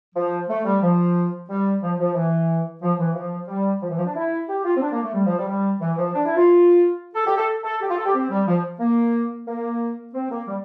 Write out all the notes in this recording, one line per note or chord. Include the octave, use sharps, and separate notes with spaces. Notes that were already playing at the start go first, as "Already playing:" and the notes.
F3
A3
G3
F3
G3
F3
F3
E3
F3
E3
F3
G3
F3
E3
F3
D4
E4
G4
F4
C4
D4
A#3
A3
G3
F3
G3
G3
E3
F3
D4
E4
F4
A4
G4
A4
A4
G4
F4
A4
G4
C4
G3
F3
A#3
A#3
C4
A#3
G3